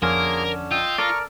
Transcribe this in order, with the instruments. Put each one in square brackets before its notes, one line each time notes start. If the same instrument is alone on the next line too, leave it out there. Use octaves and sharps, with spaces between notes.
[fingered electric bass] F2 [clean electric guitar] D3 C#4 [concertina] A#3 F4 G#4 [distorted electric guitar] A#4
[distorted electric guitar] F4 [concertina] D#5 G5 E6
[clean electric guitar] A4 A#4 D5 [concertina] A#5 C#6 F6